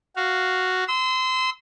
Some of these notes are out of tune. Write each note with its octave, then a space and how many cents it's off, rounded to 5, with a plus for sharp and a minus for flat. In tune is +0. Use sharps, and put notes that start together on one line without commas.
F#4 +0 F5 +0
C6 -25 E6 -25